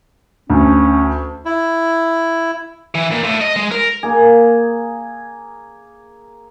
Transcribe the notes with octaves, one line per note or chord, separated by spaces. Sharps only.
D2 C#4
E4
E3
A#2
A2
D#5
G#3
A#4
A#3 G#4